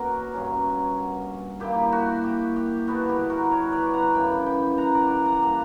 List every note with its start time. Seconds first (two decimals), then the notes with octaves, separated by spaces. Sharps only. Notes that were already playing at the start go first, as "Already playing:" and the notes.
Already playing: B2 A#3 C#4 F#4 A#4 D5
0.33 G2 F#3 C#4
1.60 A#2 A#3 E4 G4
1.92 F#4
2.24 G4
2.56 G4
2.87 D3 G3 B3 E4 F#4
3.09 G4
3.30 F#4 A#4
3.51 A#4 C#5
3.72 B4 D5
3.93 F#5 A#5
4.14 F#2 C#3 E3 G5 B5
4.46 G5 B5
4.78 F#5 A#5
4.94 D5 F#5
5.10 F#5 A#5
5.25 F#5 A#5
5.41 A#2 G3 A#3 D4 F#5 A#5